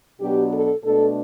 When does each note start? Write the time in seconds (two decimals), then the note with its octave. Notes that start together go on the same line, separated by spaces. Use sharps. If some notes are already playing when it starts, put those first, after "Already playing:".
0.20 B2 F#3 B3 D4 G4
0.52 A4
0.84 B2 A3 D4 A4